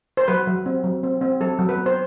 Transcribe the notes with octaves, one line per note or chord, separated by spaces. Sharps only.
C5
F#3 B4
F#3
C4
F#3
C4
C4
F#3 A4
F#3
B4
B3
C5